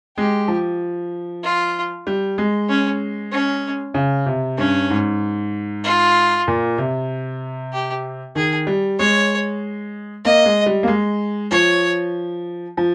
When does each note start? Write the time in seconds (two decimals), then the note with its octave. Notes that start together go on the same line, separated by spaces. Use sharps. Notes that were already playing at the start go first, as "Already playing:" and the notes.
0.17 G#3 G4
0.48 F3
1.43 F4
2.07 G3
2.38 G#3
2.69 C#4
3.32 C#4
3.94 C#3
4.26 C3
4.58 G2 C#4
4.90 G#2
5.84 F4
6.48 A#2
6.78 C3
7.73 G4
8.35 D#3 G#4
8.67 G3
8.99 G#3 C#5
10.25 A#3 D#5
10.45 G#3
10.66 G3
10.83 A#3
10.88 G#3
11.51 F3 C#5
12.77 F3